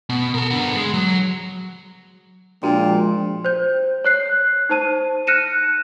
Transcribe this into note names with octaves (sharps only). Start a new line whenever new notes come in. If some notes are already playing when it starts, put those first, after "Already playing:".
B2
A4 A#4
D3 B3
G#3
F#3
A#2 F3 G#3 D4 F#4 G5
C5 G6
C#5 F#6 C7
D#4 C5 A5 D#7
F6 F#6 A#6 C#7 D#7 E7